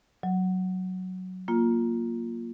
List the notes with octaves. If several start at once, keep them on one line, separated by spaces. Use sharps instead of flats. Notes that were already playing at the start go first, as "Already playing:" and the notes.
F#3
A#3 F4